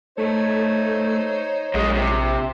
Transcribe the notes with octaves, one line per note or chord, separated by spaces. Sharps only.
A3 D#4 C5 C#5
A#1 F#2 G#3
C3